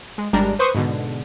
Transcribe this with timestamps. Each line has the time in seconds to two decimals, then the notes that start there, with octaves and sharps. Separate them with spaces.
0.18 G#3
0.33 G#1 G3 G#3 D4 A#4
0.59 B4 C5 C#6 D#6
0.75 G#2 B2 D3